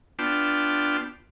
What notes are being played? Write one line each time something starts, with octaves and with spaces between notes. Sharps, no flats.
B3 D4 F4 G5 A5